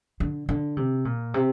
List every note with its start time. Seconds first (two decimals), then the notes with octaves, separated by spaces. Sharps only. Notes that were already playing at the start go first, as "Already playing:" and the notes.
0.20 D3
0.49 D3
0.77 C3
1.05 A#2
1.34 C3